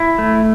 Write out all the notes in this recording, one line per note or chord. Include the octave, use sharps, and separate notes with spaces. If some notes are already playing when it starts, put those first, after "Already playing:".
Already playing: E4
A3